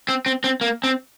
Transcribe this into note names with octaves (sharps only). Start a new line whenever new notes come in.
C4
C4
C4
A#3
C4